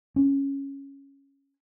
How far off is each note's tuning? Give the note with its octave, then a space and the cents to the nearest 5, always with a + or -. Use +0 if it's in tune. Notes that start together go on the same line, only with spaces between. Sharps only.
C#4 -5